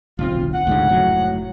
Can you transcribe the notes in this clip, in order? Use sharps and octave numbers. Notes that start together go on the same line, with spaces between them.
D1 B1 C4 F4
F#5
D2 G#2 C#3
F1 A2 F#3